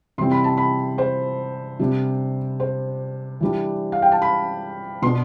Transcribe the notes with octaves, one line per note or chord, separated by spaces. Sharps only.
C3 E3 G3 C4 C6
B5
A5
B5
C5
C3 G3 D4
C5
E3 G3 D4
F5
G5
A5
B5
B2 B3 D4 C6